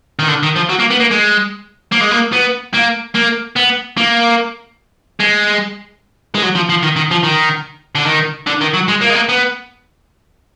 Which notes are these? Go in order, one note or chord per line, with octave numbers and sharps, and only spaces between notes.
D#3
D3
D#3
F3
F#3
A#3
B3
A#3
G#3
A#3
G#3
A#3
B3
A#3
A#3
B3
A#3
G#3
G#3
F#3
F3
F3
D#3
D#3
F3
D#3
D3
D#3
D3
D#3
F#3
G#3
A#3
G#3
A#3
B3